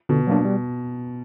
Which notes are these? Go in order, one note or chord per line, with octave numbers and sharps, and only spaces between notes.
B2 D3
F#3 A#3 D4
G3